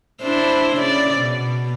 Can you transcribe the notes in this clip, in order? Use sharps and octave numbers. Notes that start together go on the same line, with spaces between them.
D4 E4 C5
C#3 D5
B2